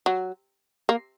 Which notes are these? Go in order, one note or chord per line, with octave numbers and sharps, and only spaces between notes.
F#3
A#3